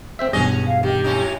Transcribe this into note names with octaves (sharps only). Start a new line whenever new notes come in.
C4 C5 E5
B1 E2 G2 C#4 G#4 D#5
F5
D#3 G4
A2 C#4 D#4